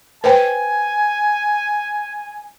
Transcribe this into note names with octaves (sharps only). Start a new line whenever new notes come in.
B4 C5 G5 G#5